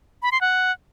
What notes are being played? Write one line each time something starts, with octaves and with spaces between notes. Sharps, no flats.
B5
C6
F#5